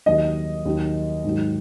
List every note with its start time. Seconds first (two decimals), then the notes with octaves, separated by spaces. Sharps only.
0.06 D#2 D#3 F#3 D#5
0.65 D#2 D#3 F#3
1.24 G#2 D#3 F#3